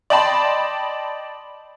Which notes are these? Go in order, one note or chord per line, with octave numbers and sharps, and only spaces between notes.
D5 D#5 G5 A5 B5 C6